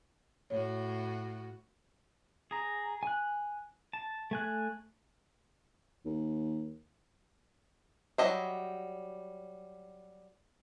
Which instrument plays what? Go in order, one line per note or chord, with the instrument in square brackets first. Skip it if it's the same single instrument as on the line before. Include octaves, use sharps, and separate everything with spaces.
[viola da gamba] A2 F#4 [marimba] C#5
[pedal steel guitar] G#4 A#5
G#5 F#6
A5
A3 G#5 F#6
[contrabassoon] D#2
[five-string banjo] F#3 G3 D4 D#5 E5